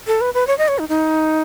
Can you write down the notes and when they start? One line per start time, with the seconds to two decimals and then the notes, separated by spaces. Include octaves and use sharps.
0.07 A4
0.21 B4
0.34 B4
0.47 C#5
0.58 D#5
0.68 C#5
0.79 D#4
0.89 D#4